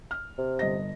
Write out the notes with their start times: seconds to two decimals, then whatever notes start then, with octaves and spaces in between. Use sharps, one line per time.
0.11 F6
0.38 C3
0.59 G1 D#5 A#6